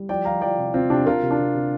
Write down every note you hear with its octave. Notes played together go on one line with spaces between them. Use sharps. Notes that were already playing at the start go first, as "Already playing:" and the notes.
Already playing: G3
F3 D5 G5
F3 F5 A#5
F3 D5 G5
C3
C3 C4 F4
C3 D4 G4
C3 F4 A#4
C3
D4
C3
C3